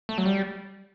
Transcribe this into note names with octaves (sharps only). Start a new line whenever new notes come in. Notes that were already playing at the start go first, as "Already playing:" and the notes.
A3
F#3
G3